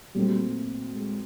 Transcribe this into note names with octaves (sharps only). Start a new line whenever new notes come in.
A#2 F#3 G3 A3 C4
G#3